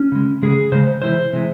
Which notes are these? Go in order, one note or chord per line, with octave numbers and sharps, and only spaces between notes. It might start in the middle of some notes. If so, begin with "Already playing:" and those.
Already playing: C#4
C#3 G#3
C#3 G#3 G#4
C#3 G#3 C5
C3 E3 G#3 C5
C3 E3 G#3